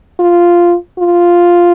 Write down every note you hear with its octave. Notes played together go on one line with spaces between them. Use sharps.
F4
F4